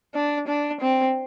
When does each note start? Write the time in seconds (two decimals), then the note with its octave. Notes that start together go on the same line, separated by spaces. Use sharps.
0.15 D4
0.48 D4
0.81 C4